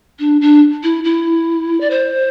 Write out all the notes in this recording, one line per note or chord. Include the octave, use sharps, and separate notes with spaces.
D4
D4
E4
E4
D5
C5